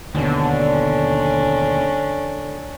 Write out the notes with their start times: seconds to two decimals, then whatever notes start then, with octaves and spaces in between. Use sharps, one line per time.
0.15 D#2 B2 D3 C#4 D4